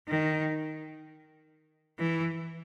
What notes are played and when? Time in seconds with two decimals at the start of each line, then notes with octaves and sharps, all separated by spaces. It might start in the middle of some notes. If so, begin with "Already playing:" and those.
0.08 D#3
1.99 E3